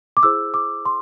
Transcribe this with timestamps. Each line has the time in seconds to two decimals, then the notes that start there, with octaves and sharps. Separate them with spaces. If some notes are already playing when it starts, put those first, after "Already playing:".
0.17 D6
0.23 E4 G#4 C5 E6
0.54 D6
0.85 C6